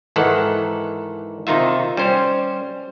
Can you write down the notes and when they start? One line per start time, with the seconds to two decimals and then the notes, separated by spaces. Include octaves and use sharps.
0.16 G#2 D#3 E3 A4 F#5
1.47 C3 D#3 D#4 F4 E5
1.97 G3 C#4 C5